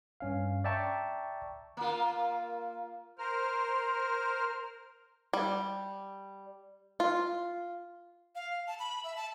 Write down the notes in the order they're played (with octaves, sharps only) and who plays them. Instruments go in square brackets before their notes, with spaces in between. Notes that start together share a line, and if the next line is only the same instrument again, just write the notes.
[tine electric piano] G2 C#4 F5
D5 E5 G5 A5 A#5 C#6
[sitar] A#3 F4
[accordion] A#4 C5 F6
[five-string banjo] G3
F4
[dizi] F5
A5
B5
E5
A5